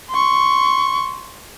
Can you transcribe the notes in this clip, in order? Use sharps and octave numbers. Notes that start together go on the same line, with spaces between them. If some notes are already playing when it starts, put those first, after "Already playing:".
C6 C#6